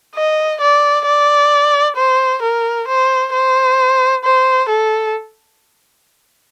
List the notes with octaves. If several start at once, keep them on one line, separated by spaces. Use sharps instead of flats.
D#5
D5
D5
C5
A#4
C5
C5
C5
A4